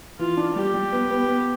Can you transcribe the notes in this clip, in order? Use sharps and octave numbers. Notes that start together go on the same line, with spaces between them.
E3 F4
D4
G3 G4
G3
B3
B3
B3